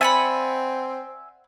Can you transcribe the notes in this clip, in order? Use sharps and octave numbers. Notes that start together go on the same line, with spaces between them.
C4 D5 E5 F#5 G#5 B5